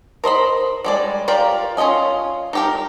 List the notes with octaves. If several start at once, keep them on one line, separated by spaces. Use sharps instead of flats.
A#4 C5 D#5 B5
G3 G#3 D5
F4 G4 A#4 D5
C#4 F4 A4 D#5 G#5
D#4 G4 A#4